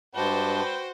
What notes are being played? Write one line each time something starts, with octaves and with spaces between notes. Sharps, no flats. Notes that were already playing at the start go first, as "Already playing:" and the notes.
G2 F#4 B4 C5 D#5 G5 A5 D6